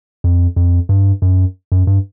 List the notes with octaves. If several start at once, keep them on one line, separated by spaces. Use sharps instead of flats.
F2
F2
G2
F#2
F#2
G2